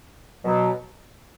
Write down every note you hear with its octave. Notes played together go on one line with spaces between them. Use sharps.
B2 F#3